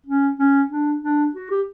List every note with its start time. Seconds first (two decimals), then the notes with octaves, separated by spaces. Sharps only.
0.06 C#4
0.39 C#4
0.70 D4
1.02 D4
1.35 F#4
1.50 G4